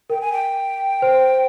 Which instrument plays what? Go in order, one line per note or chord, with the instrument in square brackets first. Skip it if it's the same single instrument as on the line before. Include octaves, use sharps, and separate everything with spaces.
[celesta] A#4 [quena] G5
[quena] G#5
G5
[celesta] C5